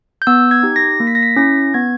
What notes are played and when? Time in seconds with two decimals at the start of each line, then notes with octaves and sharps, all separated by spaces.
0.22 G6
0.27 B3 E6
0.51 G#6
0.63 D#4 G4
0.76 A#6
1.00 A#3
1.07 B6
1.15 A#6
1.23 B6
1.36 C#4 E4 A#6
1.74 B3 G#6